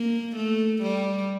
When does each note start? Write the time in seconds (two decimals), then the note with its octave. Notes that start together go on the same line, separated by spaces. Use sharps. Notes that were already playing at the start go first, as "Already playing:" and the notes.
Already playing: A#3
0.36 A3
0.82 G3